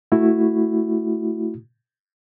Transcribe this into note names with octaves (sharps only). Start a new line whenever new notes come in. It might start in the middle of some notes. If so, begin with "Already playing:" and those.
A3 E4 F#4